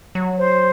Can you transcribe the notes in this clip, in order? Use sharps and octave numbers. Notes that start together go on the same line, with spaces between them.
F#3
C5